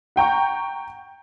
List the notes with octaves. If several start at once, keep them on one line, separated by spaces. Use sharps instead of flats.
F#5 G5 A#5 C#6